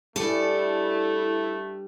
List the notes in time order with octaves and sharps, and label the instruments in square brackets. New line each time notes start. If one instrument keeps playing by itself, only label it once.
[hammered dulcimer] G2 G3 G#5 [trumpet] A3 [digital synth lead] E4 [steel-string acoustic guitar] A4 D5